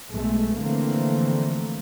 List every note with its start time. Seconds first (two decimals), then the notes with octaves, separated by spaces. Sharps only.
0.13 B1 G#3 A3
0.56 D3 E3 F3 A3 A#3 C4